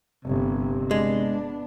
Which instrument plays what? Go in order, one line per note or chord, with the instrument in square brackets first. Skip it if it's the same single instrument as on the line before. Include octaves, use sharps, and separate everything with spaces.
[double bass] G1 [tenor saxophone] C3
[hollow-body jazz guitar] G#3 [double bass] B3 D4